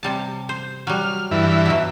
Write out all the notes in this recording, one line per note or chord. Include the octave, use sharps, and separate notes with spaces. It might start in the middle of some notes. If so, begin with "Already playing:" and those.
C3 G3 A5
C5
F#3 G3 F6
G2 E3 E5
B2 F#3